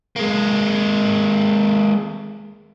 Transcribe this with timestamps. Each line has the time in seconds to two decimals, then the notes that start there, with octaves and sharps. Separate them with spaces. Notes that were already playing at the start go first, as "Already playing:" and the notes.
0.16 G#3 A#3